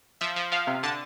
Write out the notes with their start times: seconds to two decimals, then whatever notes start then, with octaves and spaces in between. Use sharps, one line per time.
0.21 F3 E5
0.36 F3
0.52 F3 F5
0.67 C3
0.83 D3 A5